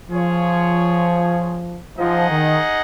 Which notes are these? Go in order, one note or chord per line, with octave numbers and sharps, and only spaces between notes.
F3 F4 G#4 C#5
F3 D#4 G#4 D#5 F#5
D#3